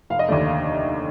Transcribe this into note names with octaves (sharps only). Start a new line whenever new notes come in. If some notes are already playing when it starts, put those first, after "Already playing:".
F1 F5
D#5
D#2 D3 A3 D5
F5